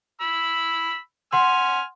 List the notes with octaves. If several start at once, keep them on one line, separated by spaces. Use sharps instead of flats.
B5 E6
F#5 G#5 C6 F6